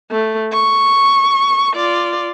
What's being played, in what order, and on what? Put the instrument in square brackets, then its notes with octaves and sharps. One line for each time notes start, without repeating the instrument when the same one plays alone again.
[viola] A3
C#6
F4 D5